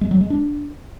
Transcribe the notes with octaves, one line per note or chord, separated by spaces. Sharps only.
G#3
F#3
G#3
D4